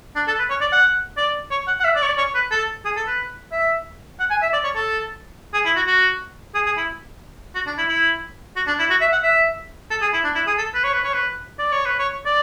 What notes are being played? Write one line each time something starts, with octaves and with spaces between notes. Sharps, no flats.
D4
A4
B4
C#5
D5
F#5
D5
C#5
F#5
F#5
E5
D5
C#5
D5
C#5
B4
A4
G#4
A4
B4
E5
F#5
G#5
E5
D5
C#5
A4
G#4
E4
F#4
F#4
G#4
G#4
E4
F#4
D4
E4
E4
F#4
D4
E4
F#4
E5
F#5
E5
A4
G#4
E4
D4
E4
G#4
A4
B4
C#5
B4
C#5
B4
D5
C#5
B4
C#5
D5